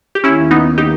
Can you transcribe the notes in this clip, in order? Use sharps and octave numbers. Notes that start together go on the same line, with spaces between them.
G4
D#2 D#3 A#3 C#4 E4
B3 D#4
D#4 G4